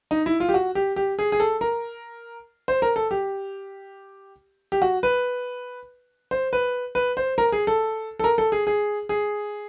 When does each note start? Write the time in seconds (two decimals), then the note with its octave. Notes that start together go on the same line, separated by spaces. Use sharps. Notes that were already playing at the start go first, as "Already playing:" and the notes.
0.11 D#4
0.26 E4
0.40 F4
0.49 G4
0.54 F#4
0.75 G4
0.96 G4
1.19 G#4
1.32 G#4
1.40 A4
1.61 A#4
2.68 C5
2.82 A#4
2.96 A4
3.11 G4
4.72 G4
4.82 F#4
5.03 B4
6.31 C5
6.53 B4
6.95 B4
7.17 C5
7.38 A#4
7.52 G#4
7.67 A4
8.19 A4
8.24 A#4
8.38 A4
8.52 G#4
8.67 G#4
9.09 G#4